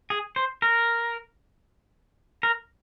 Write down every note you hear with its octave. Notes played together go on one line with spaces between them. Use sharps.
G#4
C5
A#4
A#4